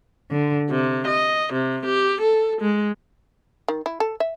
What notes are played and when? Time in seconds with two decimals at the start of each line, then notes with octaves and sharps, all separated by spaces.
0.31 D3
0.70 C3
1.07 D#5
1.53 C3
1.85 G4
2.21 A4
2.60 G#3
3.68 D#3
3.86 E4
4.00 A4
4.20 E5